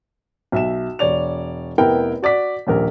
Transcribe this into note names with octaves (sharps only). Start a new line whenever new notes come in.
B1 E5 E7
E1 C#5 D5 F7
F1 B3 E4 A#4 G5
F#4 D5 D6 B6
D#1 A#1 A#4